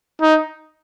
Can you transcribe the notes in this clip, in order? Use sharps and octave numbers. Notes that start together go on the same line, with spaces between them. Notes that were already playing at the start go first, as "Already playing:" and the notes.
D#4